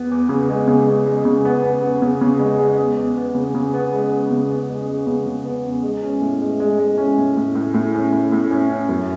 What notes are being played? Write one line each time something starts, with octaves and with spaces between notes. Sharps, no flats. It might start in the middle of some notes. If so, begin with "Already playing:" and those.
Already playing: E2 B3
E2
C#3
G#3
C#3
G#3
G#3
C#3
B3
B3
B3
C#3
C#3
G#3
G#3
E2
E2
B3
C#3
C#3
B3
G#3
B3
C#3
B3
G#3
G#3
C#3
C#3
B3
E2
G#3
C#4
A2
G#3
G#3
G#3
C#4
A2
A2
A2
A2
C#4
A2
A2
C#4
C#4
F#2